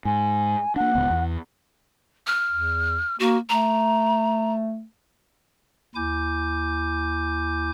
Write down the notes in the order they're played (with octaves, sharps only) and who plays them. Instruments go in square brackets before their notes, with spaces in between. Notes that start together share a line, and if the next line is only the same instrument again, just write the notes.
[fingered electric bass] G#2 [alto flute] G#5
[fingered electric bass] A#3 D4 [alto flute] F#5
[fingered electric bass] D1 C#2 B3
E2
[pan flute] F6
[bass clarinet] E2
[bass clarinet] A#3 [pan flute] F#4
[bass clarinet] A3 [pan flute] A#5
[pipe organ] D#2 E4 G#5 D6 G6